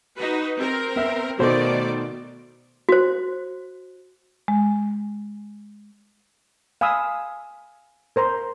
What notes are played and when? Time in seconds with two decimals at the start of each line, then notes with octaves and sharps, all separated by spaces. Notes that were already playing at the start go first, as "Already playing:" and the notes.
0.16 D#4 F#4 B4
0.58 C4 A#4
0.96 B3 E5
1.39 B2 D#3 A3 A4 C5 D5
2.89 F#4 C5
4.48 G#3
6.81 F5 G#5 B5 D#6 E6
8.16 A#4 C5 A#5 C6